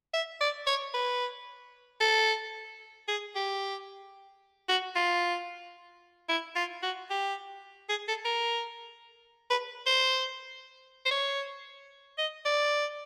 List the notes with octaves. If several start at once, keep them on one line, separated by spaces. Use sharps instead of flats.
E5
D5
C#5
B4
A4
G#4
G4
F#4
F4
E4
F4
F#4
G4
G#4
A4
A#4
B4
C5
C5
C#5
D#5
D5